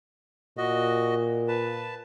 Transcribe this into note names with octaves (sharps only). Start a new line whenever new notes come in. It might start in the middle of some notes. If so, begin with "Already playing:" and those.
A#2 F#4 D#5
B4 A5